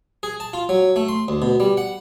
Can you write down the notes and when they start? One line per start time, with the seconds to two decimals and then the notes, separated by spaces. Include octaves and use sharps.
0.23 G#4
0.40 A5
0.53 F4
0.69 F#3
0.96 A3
1.08 C6
1.28 D2
1.42 B2
1.60 G3
1.77 F#5